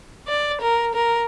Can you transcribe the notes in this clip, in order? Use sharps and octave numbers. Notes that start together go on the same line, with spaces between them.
D5
A#4
A#4